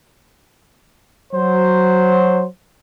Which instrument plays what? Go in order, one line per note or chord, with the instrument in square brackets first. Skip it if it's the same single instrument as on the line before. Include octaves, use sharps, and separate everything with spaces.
[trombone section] F#3 C5